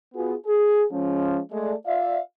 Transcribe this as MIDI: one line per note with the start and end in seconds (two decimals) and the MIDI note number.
0.15 0.34 59
0.15 0.34 65
0.15 0.34 66
0.15 0.34 68
0.47 0.83 68
0.92 1.39 53
0.92 1.39 56
0.92 1.39 61
1.52 1.73 56
1.52 1.73 57
1.52 1.73 68
1.52 1.73 74
1.86 2.19 65
1.86 2.19 74
1.86 2.19 76
1.86 2.19 77